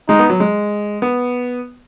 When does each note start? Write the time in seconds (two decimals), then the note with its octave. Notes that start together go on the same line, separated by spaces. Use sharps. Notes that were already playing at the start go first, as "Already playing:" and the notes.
0.09 G#3 D#4
0.19 B3
0.30 F#3
0.40 G#3
1.02 B3